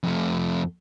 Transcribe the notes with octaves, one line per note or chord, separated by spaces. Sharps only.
F2 A3